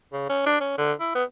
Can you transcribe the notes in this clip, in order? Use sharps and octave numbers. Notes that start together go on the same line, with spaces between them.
C#3
C#4
D4
C#4
D3
E4
B3